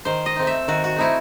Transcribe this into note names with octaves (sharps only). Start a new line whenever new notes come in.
D#3 C5
D#5
A3 C4 D#4
E5
D#3 F#4
F#4
A3 C4 D#4 E4